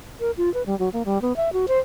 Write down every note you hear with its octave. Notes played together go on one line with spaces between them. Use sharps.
A#4
F4
B4
G3
F#3
A#3
G3
B3
E5
F#4
C5